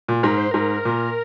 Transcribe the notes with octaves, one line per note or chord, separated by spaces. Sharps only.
A#2
G#2 A#4
C5
G#2 A#4
A#2